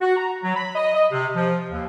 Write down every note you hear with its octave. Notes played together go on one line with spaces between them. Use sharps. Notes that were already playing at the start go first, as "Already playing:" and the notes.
F#4
A#5
F#3
B5
D#5
D#5
C3
F3
D#2